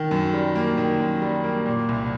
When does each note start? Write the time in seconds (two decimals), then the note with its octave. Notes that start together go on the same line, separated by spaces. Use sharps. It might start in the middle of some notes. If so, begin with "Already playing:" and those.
Already playing: D#3
0.11 F#2
0.33 G3
0.55 A#3
0.77 D#3
1.00 F#2
1.22 G3
1.44 A#3
1.66 A#2
1.89 C2